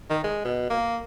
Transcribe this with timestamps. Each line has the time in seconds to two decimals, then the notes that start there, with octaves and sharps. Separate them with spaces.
0.10 D#3
0.24 G#3
0.45 B2
0.70 A#3